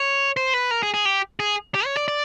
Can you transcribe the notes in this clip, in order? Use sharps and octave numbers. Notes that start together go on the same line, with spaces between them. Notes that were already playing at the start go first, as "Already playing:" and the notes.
Already playing: C#5
C5
B4
A#4
G#4
G#4
G4
G#4
G4
C#5
D5
D5